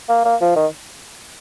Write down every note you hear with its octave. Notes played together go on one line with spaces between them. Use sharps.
A#3
A#3
F3
D#3